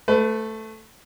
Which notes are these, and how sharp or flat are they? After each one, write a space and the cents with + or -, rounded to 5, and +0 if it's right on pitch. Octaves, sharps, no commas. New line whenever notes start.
A3 +0 B4 +35